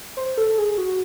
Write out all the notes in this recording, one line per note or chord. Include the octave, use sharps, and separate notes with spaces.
C5
A4
G#4
F#4